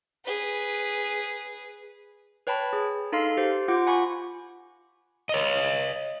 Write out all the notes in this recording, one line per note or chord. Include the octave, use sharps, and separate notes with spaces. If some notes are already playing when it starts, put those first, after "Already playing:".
G#4 B4
B4 C#5 G5 A5 B5
G#4
D#4 A4 F5 C6 F6 C7
G4 C5
F4 F#5 D6
F#5 G#5 B5 C#6
C#5 D#5